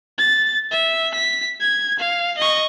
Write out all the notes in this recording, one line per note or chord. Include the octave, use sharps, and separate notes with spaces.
A6
E5
B6
G#6
F5
D#5 C#6